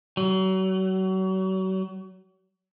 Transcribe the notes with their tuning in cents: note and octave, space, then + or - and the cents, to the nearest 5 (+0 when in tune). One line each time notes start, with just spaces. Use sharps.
F#3 +35